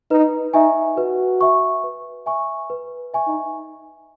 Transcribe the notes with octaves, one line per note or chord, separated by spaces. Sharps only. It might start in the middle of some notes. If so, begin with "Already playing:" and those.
D#4 B4
D#4 E5 G#5 C#6
F#4 B4
E5 G#5 C#6
B4
E5 G#5 C#6
B4
E5 G#5 C#6
D#4